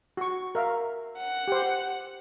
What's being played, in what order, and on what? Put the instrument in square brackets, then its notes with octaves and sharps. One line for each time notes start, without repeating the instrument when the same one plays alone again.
[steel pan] F#4 C#6
A#4 E5 F5
[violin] F#5
[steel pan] G4 C5